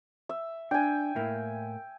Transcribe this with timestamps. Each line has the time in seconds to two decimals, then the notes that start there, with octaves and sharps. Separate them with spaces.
0.29 E5
0.71 D4 G5 G#5
1.16 A2 A#3 E4